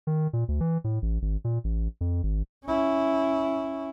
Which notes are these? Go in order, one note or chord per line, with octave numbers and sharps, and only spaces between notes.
D#3
A#2
D2
E3
A2
A1
G#1
A#2
A1
F2
G#1
C#4 E4